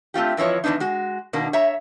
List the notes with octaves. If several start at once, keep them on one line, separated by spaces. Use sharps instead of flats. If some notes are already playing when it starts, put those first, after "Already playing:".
A3 C4 F4 G4
F2 E3 F3 C#5 D#5
E2 B2 B3 D4 D#4
G#3 F#4
B2 D#3 A#3 D4
C#5 E5 A#5